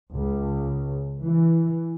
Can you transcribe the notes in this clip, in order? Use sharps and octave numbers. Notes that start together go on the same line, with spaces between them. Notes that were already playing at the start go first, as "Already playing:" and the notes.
C#2
E3